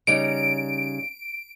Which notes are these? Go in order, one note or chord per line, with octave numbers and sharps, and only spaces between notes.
C#3 G3 D#4 D7